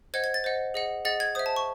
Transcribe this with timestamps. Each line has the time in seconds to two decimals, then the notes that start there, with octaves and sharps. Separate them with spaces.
0.14 C5 D#5 F#5 G#6
0.24 G#6
0.34 A6
0.44 C5 D#5 F#5
0.74 G#4 D#5 F#5
1.05 G#4 D#5 F#5 A6
1.20 G#6
1.35 C5 E5 D#6
1.46 A5
1.56 C#6